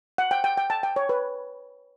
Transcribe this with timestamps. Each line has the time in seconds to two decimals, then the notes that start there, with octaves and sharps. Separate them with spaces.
0.18 F#5
0.31 G5
0.44 G5
0.58 G5
0.70 A5
0.83 G5
0.96 C#5
1.09 B4